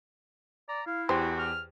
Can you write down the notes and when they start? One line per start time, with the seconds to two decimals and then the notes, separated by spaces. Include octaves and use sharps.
0.69 D5 A#5
0.87 E4 F5
1.09 E2 F#4 G4 C5 G5
1.38 F6